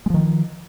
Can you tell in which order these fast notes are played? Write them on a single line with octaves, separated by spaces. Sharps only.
G#3 F3 D#3